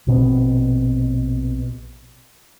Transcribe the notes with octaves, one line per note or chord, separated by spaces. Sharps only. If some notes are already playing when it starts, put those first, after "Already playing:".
A#1 B2 C4